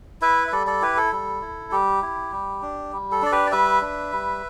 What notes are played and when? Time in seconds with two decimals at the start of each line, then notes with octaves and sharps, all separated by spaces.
0.22 E4 B4 E5
0.48 E5
0.52 G3 A4 D5
0.67 A4 D5
0.82 E4 G4 B4
0.97 A4
1.12 G3
1.42 E4
1.71 G3 G4
2.02 E4
2.32 G3
2.62 D4
2.93 G3
3.12 A4
3.22 D4 D5
3.32 G4 B4
3.47 D5
3.52 G3 B4 E5
3.82 D4
4.12 G3